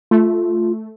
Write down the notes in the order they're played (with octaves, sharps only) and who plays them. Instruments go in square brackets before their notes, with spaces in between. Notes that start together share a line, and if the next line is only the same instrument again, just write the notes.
[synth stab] A3 [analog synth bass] F4